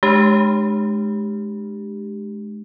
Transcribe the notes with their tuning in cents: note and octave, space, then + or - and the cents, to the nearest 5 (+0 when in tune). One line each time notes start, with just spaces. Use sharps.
G#3 +25 D4 +35 G4 +0